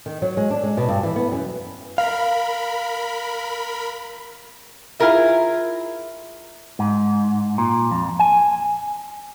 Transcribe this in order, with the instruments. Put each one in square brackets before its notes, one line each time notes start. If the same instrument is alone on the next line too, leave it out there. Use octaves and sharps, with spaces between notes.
[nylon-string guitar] D#3
F#3
G#3
D4
G#3
B2
G2
E3
B3
F#2
[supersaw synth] A#4 B5 [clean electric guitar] F5
[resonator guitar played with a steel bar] E4 F4 G#4 A#4 E5
[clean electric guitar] G#2
A#2
F2
G#5